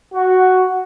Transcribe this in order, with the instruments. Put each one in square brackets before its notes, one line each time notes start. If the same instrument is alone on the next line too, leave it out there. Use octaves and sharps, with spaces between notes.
[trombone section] F#4